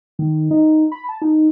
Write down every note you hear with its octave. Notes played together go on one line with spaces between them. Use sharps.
D#3
D#4
B5
A5
D#4